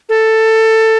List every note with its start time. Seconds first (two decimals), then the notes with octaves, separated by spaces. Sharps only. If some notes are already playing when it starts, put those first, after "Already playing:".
0.09 A4